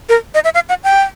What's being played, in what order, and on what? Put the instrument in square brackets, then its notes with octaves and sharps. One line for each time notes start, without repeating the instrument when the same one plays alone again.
[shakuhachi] A#4
D#5
E5
F5
F#5
G5